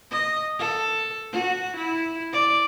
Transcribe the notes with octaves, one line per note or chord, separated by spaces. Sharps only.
D#5
A4
F#4
E4
D5